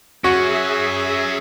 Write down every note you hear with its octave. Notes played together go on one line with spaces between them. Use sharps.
F#3 C#4 F#4 G#4 E5